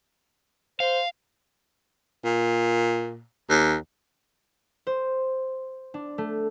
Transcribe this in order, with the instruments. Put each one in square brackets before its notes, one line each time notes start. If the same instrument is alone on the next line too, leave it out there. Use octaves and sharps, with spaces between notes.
[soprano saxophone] C5 [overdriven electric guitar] F5
[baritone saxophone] A#2
D#2
[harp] C5
D4
A3